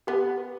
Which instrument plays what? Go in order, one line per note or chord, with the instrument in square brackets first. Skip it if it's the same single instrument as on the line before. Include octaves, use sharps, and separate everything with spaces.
[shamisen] B3 [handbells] G4